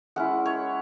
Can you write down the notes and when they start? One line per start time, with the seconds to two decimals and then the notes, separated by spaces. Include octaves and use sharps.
0.16 G#3 C#4 E4 F#5
0.46 C#5